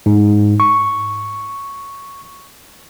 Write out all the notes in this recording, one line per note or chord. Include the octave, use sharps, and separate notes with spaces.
G#2
C#6